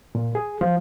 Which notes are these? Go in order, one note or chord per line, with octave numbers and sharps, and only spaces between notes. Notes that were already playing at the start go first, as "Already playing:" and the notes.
A#2
G#4
F3